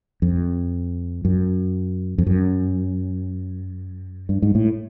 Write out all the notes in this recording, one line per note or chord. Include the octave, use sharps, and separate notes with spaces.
F2
F#2
F2
F#2
G2
G#2
A2